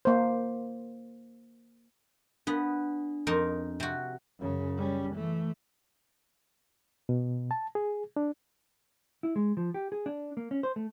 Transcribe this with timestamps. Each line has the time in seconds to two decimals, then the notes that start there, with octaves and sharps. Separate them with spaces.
0.05 A#3 C5
2.47 B3 D4
3.27 F2 D#4 A#4
3.80 C3 F#4
4.39 F#2 C#3
4.78 G3 C#4
5.15 E3 A3
7.09 B2
7.51 A5
7.75 G#4
8.16 D4
9.23 E4
9.36 G#3
9.57 F3
9.74 G4
9.92 G#4
10.06 D4
10.37 A#3
10.51 C#4
10.63 C5
10.76 A3